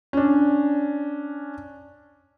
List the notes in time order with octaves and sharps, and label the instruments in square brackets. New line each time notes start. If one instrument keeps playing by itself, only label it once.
[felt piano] C#4 D4